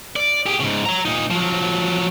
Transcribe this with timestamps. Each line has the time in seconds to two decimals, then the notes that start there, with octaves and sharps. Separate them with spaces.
0.16 D5
0.46 G4 G#4
0.60 G#2 C#3
0.86 C#5 A#5
1.05 A#2 D#4
1.31 F3 F#3